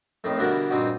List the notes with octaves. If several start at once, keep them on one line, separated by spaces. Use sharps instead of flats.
F2 A2 D#3
B2 D3 E3 G3 F#4 A#4
G2 A#2 C4 D#4 F#4